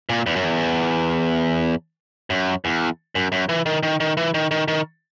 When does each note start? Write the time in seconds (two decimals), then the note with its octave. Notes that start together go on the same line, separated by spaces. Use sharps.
0.09 A#2
0.26 E2
0.36 F#2
0.44 E2
2.30 F#2
2.65 E2
3.15 F#2
3.32 F#2
3.49 E3
3.66 D#3
3.83 D#3
4.00 D#3
4.17 E3
4.34 D#3
4.51 D#3
4.68 D#3